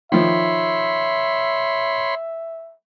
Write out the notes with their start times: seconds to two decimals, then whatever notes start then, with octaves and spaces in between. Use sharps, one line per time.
0.12 D#3 F3 C#5 E5 B5 C6